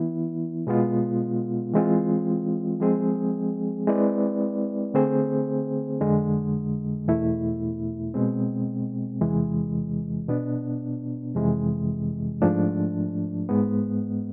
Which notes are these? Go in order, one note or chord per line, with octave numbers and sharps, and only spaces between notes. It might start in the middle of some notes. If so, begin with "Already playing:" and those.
Already playing: E3 B3 E4
B2 G#3 B3 F4
E3 G#3 C4 F4
F3 G#3 C4 G#4
G#3 C4 E4 B4 D5
D3 A3 C4 G#4 C5
F2 D3 G#3
E2 B2 A3 E4
B2 G#3 C4
E2 C3 E3 G#3
B2 B3 D4
F2 C3 E3 G#3
G#2 F3 A3 D4
G#2 G#3 B3